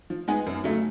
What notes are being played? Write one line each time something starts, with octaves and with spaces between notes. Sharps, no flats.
F3
G#3 B3 D#4 G#4
F#2
C#3 F#3 A3